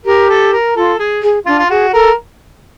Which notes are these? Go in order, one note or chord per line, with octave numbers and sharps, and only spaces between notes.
G4 A#4
A4
A#4
F4 A4
G#4
G#4
D4 F4
F4
F#4 G#4
A4 A#4